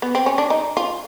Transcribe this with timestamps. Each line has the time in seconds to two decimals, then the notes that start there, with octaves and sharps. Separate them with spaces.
0.02 B3
0.15 C4
0.26 C#4
0.38 D4
0.50 D#4
0.77 F4